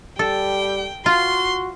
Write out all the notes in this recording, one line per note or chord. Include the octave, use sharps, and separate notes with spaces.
G3 A4 G5
F4 F#4 C6